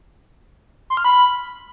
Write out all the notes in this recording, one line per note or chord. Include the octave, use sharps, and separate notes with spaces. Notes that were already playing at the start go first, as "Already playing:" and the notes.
C6
F6
B5